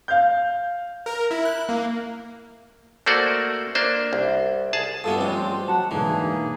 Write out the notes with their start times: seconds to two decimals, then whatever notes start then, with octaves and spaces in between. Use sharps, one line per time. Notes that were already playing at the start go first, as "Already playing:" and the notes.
0.08 F5 G6
1.06 A#4
1.31 E4
1.45 F#6
1.69 A#3
3.06 A3 A#3 F#4 C5 D5
3.75 A#3 D4 C5
4.13 C2
4.73 G#4 A5
5.04 G2 C3 A3 B3 F4 F#4 A4 D#6
5.17 F3 G3 G#3 C4 C#4
5.35 C6
5.68 F#3 F#5 A5
5.91 E1 G#2 D3 E3 G#3 A#3 G#4